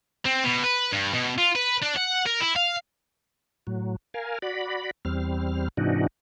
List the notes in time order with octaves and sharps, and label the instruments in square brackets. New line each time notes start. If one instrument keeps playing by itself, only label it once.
[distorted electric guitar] C4
B2
B4
G2
B2
F4
B4
D4
F#5
A#4
E4
F5
[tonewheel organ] A2 F#3
A#4 F5 G#5
F#4 D5 B5
E2 G3 C4 F6
G#2 C3 E3 D4 D#4 F#4